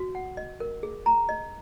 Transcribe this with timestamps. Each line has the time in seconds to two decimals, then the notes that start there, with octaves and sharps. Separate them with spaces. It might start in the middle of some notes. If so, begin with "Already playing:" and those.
Already playing: F#4
0.15 F#5
0.37 D#5
0.60 A#4
0.83 G#4
1.06 A#5
1.29 D#5